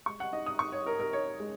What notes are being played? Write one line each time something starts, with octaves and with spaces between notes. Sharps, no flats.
G#3 C#6
F#5
D#4 D#5
D#6
D#4 C#6
C#5
D#4 A#4
A#4
D#4 C#5
G#3